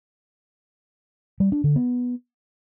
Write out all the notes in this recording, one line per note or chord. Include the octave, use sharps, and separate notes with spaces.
G3
D4
D3
B3